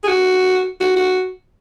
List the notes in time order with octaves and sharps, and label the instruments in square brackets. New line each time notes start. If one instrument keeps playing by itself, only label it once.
[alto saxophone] G#4
F#4
F#4
F#4